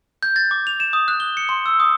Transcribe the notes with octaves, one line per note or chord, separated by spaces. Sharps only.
G6
A6
D6
F7
E7
D#6
F#6
G7
C#7
C6
E6
D#6